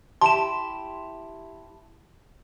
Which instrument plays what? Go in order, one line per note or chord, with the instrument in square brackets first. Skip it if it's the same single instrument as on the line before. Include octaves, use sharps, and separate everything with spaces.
[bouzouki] E4 G4 [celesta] A5 [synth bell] C6 E7